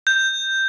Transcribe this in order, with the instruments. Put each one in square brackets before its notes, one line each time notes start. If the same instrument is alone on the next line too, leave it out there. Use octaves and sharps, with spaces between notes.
[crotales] G6